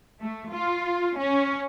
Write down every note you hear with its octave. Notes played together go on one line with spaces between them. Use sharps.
A3
F4
C#4